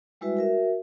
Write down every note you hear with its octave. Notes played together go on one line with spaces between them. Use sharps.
G3 G#3 E4 F#4 B4 E5
F#4 A#4 E5